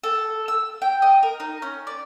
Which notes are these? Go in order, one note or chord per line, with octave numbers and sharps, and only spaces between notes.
A4
E6
G5
D#5
A#4
D#4
C#4
D5